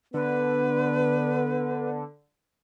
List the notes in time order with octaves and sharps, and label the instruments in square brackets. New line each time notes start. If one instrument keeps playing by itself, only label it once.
[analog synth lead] D3 [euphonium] B3 [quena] B4